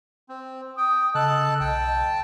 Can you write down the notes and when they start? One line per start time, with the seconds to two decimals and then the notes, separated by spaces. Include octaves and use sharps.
0.29 C4
0.77 G5 D#6
1.15 C#3 A4 D#5 A5 F#6
1.60 B1 G5 A5